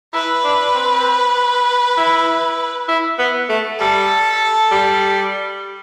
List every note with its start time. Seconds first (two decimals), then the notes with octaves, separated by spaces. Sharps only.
0.14 E4 B4
0.44 D4
0.75 C4
1.97 E4
2.89 E4
3.19 B3
3.50 A3
3.80 G3 A4
4.72 G3